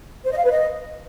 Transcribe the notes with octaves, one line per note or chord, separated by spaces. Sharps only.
C5
D#5
F5
B4
D#5